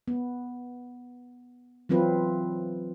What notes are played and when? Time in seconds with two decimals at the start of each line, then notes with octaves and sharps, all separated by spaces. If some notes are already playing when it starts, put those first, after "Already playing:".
0.08 B3
1.89 E3 F#3 C4 F4 B4